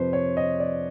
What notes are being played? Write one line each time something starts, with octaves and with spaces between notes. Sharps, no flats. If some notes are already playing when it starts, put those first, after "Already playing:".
Already playing: F2 C3 F3 B4 C5
C#5
D#5
D5